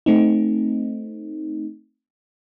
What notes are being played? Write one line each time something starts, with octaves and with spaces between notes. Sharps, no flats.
A3 C4 D#4